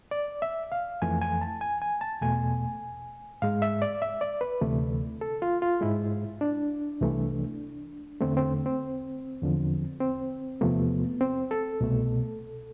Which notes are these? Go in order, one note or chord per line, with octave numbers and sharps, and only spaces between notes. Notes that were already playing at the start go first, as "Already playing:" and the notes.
D5
E5
F5
F2 E3 A3 G#5
G#5
A5
G#5
G#5
A5
E2 B2 A3 G#5
G#2 G#3 F5
E5
D5
E5
D5
B4
D2 C3 E3 A3
A4
F4
F4
G#2 G#3 E4
D4
C2 C3 E3 A3
E2 D3 A3 C4
C4
C4
E2 D3 F3
C4
E2 C3 F3 A3 B3
C4
A4
C2 B2 A3